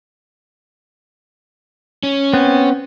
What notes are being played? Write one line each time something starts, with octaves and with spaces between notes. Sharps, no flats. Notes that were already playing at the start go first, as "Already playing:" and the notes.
C#4
B3 C4